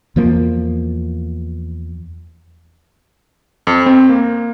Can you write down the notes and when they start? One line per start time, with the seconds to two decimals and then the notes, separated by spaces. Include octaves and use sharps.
0.16 E2 F3 A#3
3.67 F2
3.86 C4
4.09 A#3